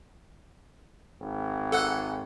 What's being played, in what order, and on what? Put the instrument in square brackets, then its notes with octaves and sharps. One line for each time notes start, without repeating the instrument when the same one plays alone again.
[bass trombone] G#1
[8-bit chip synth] A4 F#5 F#6